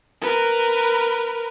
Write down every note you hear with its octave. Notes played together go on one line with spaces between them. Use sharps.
A#4 B4